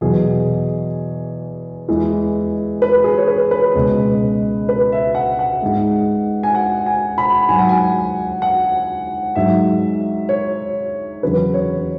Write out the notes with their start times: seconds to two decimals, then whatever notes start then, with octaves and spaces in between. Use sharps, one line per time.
0.01 E2 B2 F#3 G#4
1.89 E2 E3 G#3
2.82 B4
3.04 G#4
3.17 C#5
3.28 B4
3.51 B4
3.75 C#2 B2 G#3
4.69 B4
4.92 E5
5.15 F#5
5.39 F#5
5.62 G#2 G#3
6.43 G#5
6.55 F#5
6.86 G#5
7.18 B5
7.48 G#2 F#3 G#5
7.58 F#5
7.69 G#5
8.42 F#5
9.35 G#2 F#3 E5
10.29 C#5
11.23 E2 C#3 F#3 B4
11.54 C#5